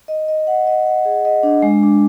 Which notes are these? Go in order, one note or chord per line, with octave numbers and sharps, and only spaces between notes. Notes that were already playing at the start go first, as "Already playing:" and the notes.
D#5
D#5
F#5
D#5
F#5
G#4
D#5
D4
G#3
D4